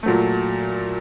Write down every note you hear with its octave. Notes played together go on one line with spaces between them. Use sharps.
A#2 F#3 A3